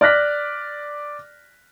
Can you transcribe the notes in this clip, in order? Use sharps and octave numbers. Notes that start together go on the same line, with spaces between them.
D5 F6 F#6 A#6 B6